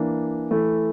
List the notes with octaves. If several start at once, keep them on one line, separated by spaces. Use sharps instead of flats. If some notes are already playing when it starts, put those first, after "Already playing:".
Already playing: E3 A#3 D4
E3 A3 E4